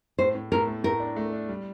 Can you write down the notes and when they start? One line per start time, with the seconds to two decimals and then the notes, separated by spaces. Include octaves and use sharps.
0.19 A2 C5
0.35 A2
0.52 A2 A#4
0.67 A3
0.84 A2 A#4
1.00 D4
1.16 A3
1.33 D4
1.49 G3